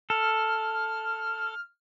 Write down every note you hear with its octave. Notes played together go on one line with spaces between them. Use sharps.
A4 F6